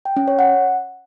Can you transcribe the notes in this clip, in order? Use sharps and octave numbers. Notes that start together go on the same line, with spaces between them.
G5
C#4
C#5
F#5